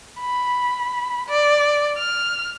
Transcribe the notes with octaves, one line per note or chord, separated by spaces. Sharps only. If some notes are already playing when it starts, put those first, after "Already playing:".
B5
D5
F6